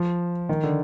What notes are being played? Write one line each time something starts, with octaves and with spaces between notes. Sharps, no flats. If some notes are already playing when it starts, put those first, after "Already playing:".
Already playing: F3
D#3
D3